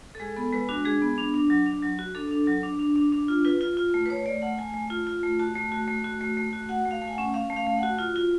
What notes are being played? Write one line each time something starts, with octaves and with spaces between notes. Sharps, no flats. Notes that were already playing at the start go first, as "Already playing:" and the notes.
A4
G#3 G#4
B3 A4
G#3 B4
D4 F#4
G#3 G#4
B3
D4
D4
F#3
D4
F#3
F#4
D4 A4
D4
F#3
D4
D4
D4
D4
F4
F4 B4
F4
F4
A3
B4
A3 C#5
A3 D5
A3 F#5
A3 G#5
A3
F4
F4
A3
F#4 A5
A3
F#4
A3
F#4
A3
A3
F#4
F#4 F#5
A3
F5
A3
G#5
F#5
C#4
C#4 F5
A3
F5
A3
F#5
F#4
F4
F4